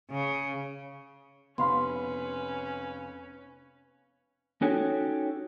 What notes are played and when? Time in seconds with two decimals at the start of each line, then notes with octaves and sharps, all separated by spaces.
0.10 C#3
1.58 F1 B3 C#4 B4 F5 B5 C6
4.62 C#4 D#4 F#4 G4 A4 C#5